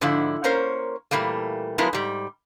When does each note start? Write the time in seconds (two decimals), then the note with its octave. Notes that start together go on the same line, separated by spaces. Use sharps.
0.01 G#2 D3 F3 E4
0.44 A#3 C#4 A#4 C5 C#5
1.11 A#2 E3 G3 A3 A#3
1.78 F3 F#3 G#3 B3 E4 A#4
1.93 G#2 G3